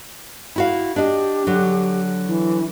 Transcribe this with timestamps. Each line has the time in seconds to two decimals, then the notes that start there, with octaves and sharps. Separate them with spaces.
0.56 E4 F#4 F5
0.96 D4 G4 D#5
1.47 D3 F#3
2.26 E3